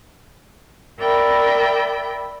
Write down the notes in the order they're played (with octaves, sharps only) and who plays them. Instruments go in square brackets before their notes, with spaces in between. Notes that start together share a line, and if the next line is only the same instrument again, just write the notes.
[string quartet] A#4 D5 E5 G5 B5